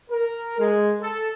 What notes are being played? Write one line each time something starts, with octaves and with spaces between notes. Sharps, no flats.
A#4
G#3
A4